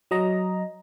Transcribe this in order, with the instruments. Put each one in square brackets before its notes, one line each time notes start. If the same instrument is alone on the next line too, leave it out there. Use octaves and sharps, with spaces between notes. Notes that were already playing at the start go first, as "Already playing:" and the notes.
[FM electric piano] F#3 D#5 A#5